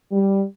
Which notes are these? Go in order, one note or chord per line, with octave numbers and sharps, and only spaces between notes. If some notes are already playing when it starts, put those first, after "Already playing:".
G3